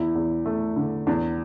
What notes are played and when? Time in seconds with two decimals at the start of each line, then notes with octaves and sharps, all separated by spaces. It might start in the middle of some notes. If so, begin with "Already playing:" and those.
Already playing: E2 E4
0.15 E2
0.46 A3
0.76 D3
1.07 E2 D4